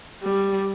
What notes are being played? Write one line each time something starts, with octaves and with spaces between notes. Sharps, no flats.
G3